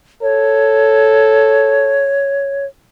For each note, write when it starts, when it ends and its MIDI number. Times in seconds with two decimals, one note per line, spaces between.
0.22 2.16 69
0.22 2.65 73